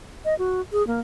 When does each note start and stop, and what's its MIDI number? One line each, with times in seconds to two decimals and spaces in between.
0.25 0.37 75
0.39 0.61 66
0.72 0.85 68
0.87 1.00 58